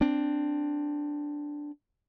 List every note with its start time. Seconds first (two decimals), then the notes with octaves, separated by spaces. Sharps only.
0.01 C4 D4